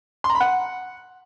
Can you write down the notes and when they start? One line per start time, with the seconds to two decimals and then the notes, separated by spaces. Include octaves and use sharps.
0.24 C6
0.30 A#5
0.35 B5
0.41 F#5